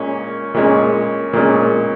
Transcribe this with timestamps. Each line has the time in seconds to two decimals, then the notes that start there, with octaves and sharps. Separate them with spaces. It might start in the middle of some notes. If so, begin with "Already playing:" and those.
Already playing: A#2 G#3 C#4
0.54 A#2 G#3 C#4
1.33 A#2 G#3 C#4